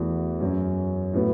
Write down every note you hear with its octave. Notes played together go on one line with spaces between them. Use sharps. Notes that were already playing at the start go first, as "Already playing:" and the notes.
Already playing: E2 E3 A3 F#4
F#2 F#3 C#4
A2 F#3 B3 F#4